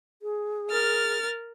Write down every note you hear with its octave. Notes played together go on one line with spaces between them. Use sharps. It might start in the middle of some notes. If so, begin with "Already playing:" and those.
G#4
A#4 F6 A6